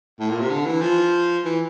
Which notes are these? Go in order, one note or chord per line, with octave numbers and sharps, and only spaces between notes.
A2
A#2
C3
D3
E3
F3
E3